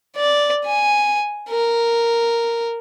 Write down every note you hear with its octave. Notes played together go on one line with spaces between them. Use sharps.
D5
G#5
A#4